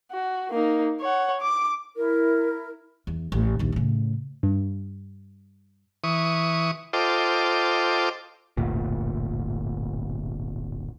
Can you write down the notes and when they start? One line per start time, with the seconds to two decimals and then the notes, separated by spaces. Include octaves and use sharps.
0.11 F#4
0.50 A#3 D#4
1.01 C#5 F#5
1.41 D6
1.96 E4 A#4
3.07 E2
3.32 A1
3.59 A#1 D#2
3.72 A2 C#3
4.43 G2
6.04 E3 C#6 D#6
6.93 F4 A4 C5 D#5 G5 D6
8.57 D1 G1 D2 A#2